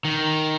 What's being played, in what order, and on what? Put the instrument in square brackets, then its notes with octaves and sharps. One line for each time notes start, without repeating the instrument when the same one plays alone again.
[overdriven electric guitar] D#3